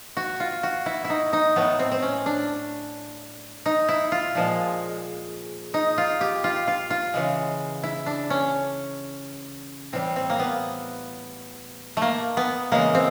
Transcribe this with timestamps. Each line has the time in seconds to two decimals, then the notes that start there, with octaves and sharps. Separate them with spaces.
0.17 F#4
0.40 F4
0.63 F#4
0.86 E4
1.05 E4
1.10 D#4
1.33 D#4
1.56 A2 F#3 A3 B3
1.80 C4
1.92 C4
2.02 C#4
2.26 D4
3.66 D#4
3.89 E4
4.12 F4
4.35 A#2 F3 G#3
5.74 D#4
5.98 F4
6.21 G4
6.44 F4
6.68 F4
6.90 F4
7.14 C#3 E3 G#3
7.83 E4
8.06 D4
8.30 C#4
9.93 A2 E3 G3 C4
10.16 C4
10.30 A#3
10.39 B3
11.97 A3 A#3
12.37 B3
12.72 C#3 E3 G#3 A#3
12.95 C4